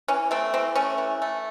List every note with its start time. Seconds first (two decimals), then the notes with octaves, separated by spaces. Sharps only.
0.08 E3 C#4
0.31 A3 C4
0.54 E3 C4
0.76 A3 C#4
0.98 E3
1.22 A3